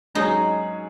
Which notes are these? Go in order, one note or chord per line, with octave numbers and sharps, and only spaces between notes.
G#2 F#3 C#4 D#4 G#4